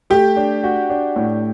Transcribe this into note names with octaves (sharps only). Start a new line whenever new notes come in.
A3 G4
D4
F#4
D4
A2